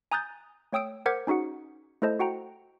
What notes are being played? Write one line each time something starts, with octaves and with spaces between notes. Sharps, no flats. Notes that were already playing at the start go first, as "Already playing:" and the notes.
G#5 A#5 D#6 F#6 G6 A6
A3 C#5 G5 D#6 E6 D7
A#4 C5 F#5 D6 G#6 B6
C#4 D#4 F#4 G#4 F#5
A3 E4 A4 C5 D#5 A5
F#4 F#5 G5 A#5